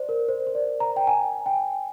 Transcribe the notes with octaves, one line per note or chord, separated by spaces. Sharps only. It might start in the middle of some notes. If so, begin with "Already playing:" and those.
Already playing: C5 D5
A#4
C5
C5
D5
A#5
G5
G#5
G5